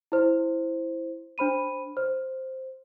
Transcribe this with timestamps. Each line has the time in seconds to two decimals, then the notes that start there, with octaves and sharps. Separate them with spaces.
0.12 E4 C5
1.38 D4 C5 B5 D#7
1.97 C5